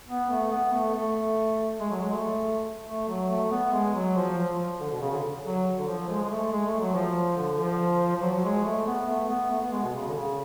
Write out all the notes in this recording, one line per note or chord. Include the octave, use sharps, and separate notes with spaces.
B3
A3
B3
A3
A3
G#3
F#3
G#3
A3
A3
F#3
A3
B3
G#3
F#3
F3
F3
D3
B2
C#3
D3
F#3
D3
F3
G#3
G#3
A3
G#3
A3
F#3
F3
D3
F3
F3
F#3
F#3
G#3
A3
B3
A3
B3
A3
B3
G#3
B2
C#3
D3
C#3